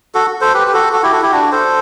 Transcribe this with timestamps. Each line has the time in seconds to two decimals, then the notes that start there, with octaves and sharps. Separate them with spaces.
0.15 F#4 A4
0.41 A4 C5
0.54 G4 B4
0.68 G4
0.74 F#4 A4
0.93 F#4 A4
1.03 E4 G4
1.12 F#4 A4
1.22 E4 G4
1.32 D4 F#4
1.52 A4 C5